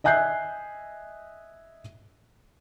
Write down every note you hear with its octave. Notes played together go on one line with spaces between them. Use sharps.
D#5 E5 G#5 F#6 G6 C7